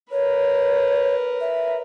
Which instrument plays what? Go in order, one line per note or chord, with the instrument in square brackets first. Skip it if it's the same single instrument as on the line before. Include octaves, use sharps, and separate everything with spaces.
[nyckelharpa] A#4 B4 [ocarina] C#5
[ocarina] E5